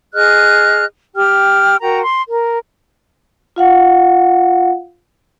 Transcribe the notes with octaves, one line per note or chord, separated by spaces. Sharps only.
G#4 D#5 F6 F#6
G4 G5 F6
F#4 A#4 G5 A#5
C6
A#4
F4 F5 F#5